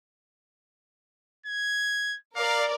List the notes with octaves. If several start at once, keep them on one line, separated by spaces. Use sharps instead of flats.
G#6
A#4 D5 F5